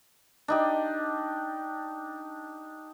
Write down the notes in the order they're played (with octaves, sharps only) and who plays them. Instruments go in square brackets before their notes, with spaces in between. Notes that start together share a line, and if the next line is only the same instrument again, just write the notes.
[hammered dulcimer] D4 D#4 G4